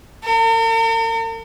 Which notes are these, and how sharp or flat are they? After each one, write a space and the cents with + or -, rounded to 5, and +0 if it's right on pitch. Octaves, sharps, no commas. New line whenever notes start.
A#4 -45